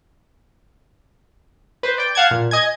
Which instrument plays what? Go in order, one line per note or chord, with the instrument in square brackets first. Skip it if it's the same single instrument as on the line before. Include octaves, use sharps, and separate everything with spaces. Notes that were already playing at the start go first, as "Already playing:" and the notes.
[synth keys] B4 C5
D5 G5
F5 F#5 A5 G#6
A#2
D#5 G#5 G#6